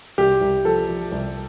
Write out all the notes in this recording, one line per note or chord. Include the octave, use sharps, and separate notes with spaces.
C2 G4
C2
F3 A4
F3
C2